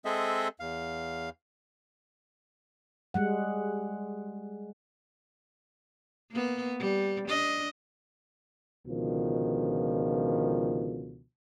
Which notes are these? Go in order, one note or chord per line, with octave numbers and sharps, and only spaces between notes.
G#3 C4 G#4 A4 D#5 E5
E2 F5
G3 G#3 F#5
A#3 B3
G3
D4 D#5
C#2 B2 D3 D#3 F3